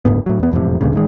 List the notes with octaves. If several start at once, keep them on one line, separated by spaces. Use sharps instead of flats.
F#1 D2 G#2 B3
A2 F#3
E2 B3
E1 F2 A2 C3
D2 G2 A#2 C#3
A1 D#3 G#3